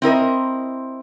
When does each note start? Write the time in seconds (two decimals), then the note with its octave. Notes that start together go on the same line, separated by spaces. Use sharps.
0.02 C4 E4 A#4 D#5